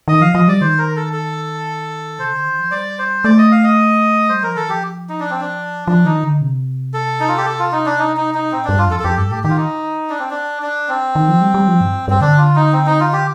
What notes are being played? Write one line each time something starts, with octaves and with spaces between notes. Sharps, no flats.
D#3 D#5
F3 F5
F3 D#5
G3 D5
D#3 C5
A#4
A4
A4
C3 C5
D3
D#3
F3
G3 D5
C5
A3 D5
D#5
F5
D#5
G3 C5
F3 A#4
D#3 A4
F3 G4
D#4
D4
C4
D4
F3 D4
D#3 D#4
D3
C3
A4
D#4
F4
G4
A4
F4
D#4
D4
D#4
D#4
D#4
A#2 C4
G2 D4
F4
F2 A4
A4
F2 G4
G2 A4
A2 G4
D#3 G4
F4
D#4
D4
C4
D4
D4
C4
D#3
F3
G3
G3
F3
G2
G2 C4
D3 D4
F4
D#4
C4
D#4
F4
G4